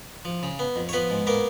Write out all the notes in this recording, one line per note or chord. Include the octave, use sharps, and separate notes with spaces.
F3
C#3
B3
F2
C#5
F3 B3 B4
G#2
A#3 B3 A#4